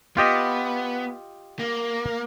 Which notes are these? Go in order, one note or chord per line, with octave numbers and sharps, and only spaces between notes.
B3 F4 G4 D#5
A#3